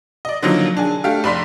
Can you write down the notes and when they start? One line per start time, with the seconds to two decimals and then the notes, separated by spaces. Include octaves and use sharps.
0.25 D5 D#5
0.42 D3 D#3 F3 F#3 A#3 D#4
0.77 D4 G#4
1.04 A3 D4 G4 F5
1.24 F1 D5 B5 C6 B6